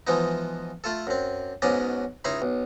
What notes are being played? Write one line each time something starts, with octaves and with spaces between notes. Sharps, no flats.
E3 F3 G#3 B3 D#4
A3 F4 A4
F#2 C4
B1 G#2 F#3 C#4 D5 D#5
C#2 D#4 E4 C#5 B5 C6
B1